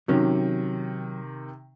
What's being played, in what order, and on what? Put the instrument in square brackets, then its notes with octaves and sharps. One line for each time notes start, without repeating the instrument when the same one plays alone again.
[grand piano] C3 D#3 [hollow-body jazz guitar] F#3 C#4